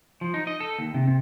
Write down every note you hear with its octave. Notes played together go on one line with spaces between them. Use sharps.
F3
D#4
D#5
A4
D#2
C3
C3